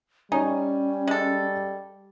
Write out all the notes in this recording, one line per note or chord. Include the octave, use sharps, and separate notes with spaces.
G3 C#4 D#4 C#5 G#5
G#3 A4